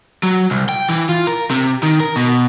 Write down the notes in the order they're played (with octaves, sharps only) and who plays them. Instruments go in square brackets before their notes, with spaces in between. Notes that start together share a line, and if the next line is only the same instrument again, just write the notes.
[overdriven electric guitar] F#3
C2
G5
E3
F4
A#4
C3
D#3
A#4
B2